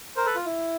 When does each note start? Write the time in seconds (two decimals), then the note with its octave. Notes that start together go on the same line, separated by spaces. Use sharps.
0.16 A#4 C5
0.25 A4 B4
0.36 F4
0.46 E4